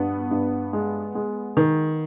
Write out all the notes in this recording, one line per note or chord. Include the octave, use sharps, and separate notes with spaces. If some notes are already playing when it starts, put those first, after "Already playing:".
Already playing: G2 B3
G2
G#3
G#3
D#3